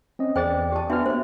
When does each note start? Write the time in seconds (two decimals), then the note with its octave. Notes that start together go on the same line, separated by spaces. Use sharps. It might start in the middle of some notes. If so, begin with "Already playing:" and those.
0.19 C4 C#4 D#5
0.36 E2 G#4 C5 D5 G5 A6
0.72 G4 A5
0.89 B3 D4 F#4 E5 F6
1.06 A#3 C5 E5